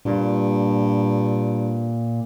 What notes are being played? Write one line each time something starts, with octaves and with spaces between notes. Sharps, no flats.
G2 A#2